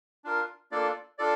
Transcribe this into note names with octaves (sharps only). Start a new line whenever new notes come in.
D4 F4 A#4
A#3 D4 F4 A4 D5
D4 F4 A4 D5